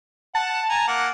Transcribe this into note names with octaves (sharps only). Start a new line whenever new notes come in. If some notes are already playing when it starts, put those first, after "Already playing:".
F#5 A5
G#5 A#5
A#3 F#5